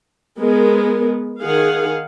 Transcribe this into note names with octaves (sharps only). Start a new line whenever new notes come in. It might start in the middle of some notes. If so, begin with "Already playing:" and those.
G#3 B3 A#4
D#3 G#4 F5 F#5